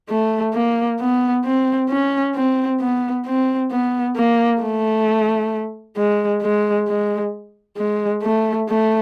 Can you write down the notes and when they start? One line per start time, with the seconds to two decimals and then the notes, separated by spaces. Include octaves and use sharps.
0.10 A3
0.54 A#3
1.00 B3
1.45 C4
1.90 C#4
2.35 C4
2.80 B3
3.26 C4
3.71 B3
4.16 A#3
4.61 A3
5.97 G#3
6.43 G#3
6.88 G#3
7.77 G#3
8.23 A3
8.69 A3